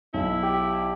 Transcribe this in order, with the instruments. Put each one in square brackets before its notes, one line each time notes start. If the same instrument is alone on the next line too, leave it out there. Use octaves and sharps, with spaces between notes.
[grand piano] B1 [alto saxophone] E4
[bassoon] G4